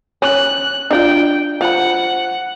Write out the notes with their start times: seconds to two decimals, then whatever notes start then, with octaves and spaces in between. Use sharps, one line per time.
0.22 C#4 F#6
0.91 D4 D#4 F4 G5
1.61 F3 F#5 B5